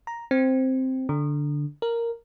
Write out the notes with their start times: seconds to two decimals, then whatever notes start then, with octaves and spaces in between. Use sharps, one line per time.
0.07 A#5
0.31 C4
1.09 D3
1.82 A#4